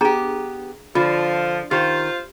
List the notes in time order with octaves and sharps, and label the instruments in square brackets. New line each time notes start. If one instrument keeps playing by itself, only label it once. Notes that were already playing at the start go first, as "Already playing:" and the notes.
[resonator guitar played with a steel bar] B3 G4 [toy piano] D4 G#4 A#5
[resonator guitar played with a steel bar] D3 [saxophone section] F3 [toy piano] F4
[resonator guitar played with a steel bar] D#3 [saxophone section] F4 C5 [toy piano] G4